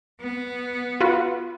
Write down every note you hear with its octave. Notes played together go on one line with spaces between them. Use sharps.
B3
F4 F#4 B4